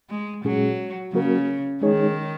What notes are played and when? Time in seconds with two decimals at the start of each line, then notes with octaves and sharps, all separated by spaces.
0.10 G#3
0.45 A#2 F#3 G#3 C#4 G#4
1.13 C#3 F#3 A#3 F#4 A#4
1.82 D#3 G#3 D#4 G#4 C#5